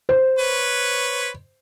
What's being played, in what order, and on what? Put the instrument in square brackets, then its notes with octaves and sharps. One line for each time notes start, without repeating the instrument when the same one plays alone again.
[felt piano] C5
[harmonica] B4 C#5